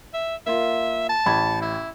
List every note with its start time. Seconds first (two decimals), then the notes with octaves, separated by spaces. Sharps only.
0.14 E5
0.46 A#3 F4 E5
1.09 A5
1.26 A1 B5 G#6
1.62 E4